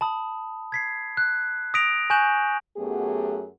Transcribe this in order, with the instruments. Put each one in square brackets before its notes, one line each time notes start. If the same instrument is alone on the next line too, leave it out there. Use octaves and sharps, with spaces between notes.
[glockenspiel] A5 B5 D#6
G#6 B6 C7
F#6
D#6 A#6 B6 D7 F7
G#5 C#6 F#6 G6 E7 F#7
[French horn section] F#2 F#3 A3 B3 G4 G#4